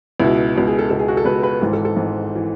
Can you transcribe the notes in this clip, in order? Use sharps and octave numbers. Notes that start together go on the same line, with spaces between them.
C#2 B2 E4
C#2 B2
G#4
A4
C#2 B2 A4
G#4
F#4
A4
C#2 B2 B4
B4
G#1 G#2 E3 A4
A4
A4
G#1 G#2 E3
E3